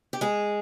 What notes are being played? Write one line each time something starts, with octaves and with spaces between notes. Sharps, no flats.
G4
G#3 G#4